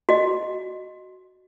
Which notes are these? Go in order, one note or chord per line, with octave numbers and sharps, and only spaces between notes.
F#4 D#5